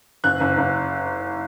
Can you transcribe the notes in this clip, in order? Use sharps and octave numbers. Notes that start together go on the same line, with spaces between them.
F#1 F#6
F#1
F#1